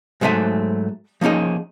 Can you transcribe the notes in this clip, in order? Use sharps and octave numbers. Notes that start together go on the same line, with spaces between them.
G#2 F#3 A3 C5 E5 G#5
F3 A#3 C#4 D#4 G#4